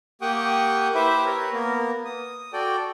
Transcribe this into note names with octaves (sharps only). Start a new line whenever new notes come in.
A#3 G4 F#5 G5 C#6 D#6
E4 G4 B4 C5 E5
A#4 B4 C#5
A#3 B3 A#4
D#6
F#4 A4 D5 G5